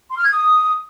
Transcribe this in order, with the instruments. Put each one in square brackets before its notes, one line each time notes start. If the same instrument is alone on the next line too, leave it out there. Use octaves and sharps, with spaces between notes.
[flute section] C6
F6
G#6
D#6